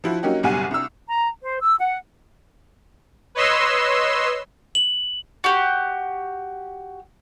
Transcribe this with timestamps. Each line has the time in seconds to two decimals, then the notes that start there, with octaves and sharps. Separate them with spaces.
0.04 F3 E4 F#4
0.23 F#3 A#3 C#4 D#4 F#4 G4
0.43 F#1 B1 G3 F#5 G#5
0.71 C2 E6
1.08 A#5
1.42 C5
1.62 E6
1.80 F#5
3.35 B4 C#5 D#5 C6 E6
4.75 F#7
5.44 F#4 G4